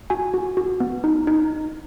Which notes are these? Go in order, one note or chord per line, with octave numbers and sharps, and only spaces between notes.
F#4 G#5
F#4
F#4
B3
D#4
D#4